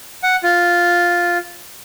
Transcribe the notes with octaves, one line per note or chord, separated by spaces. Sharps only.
F#5
F4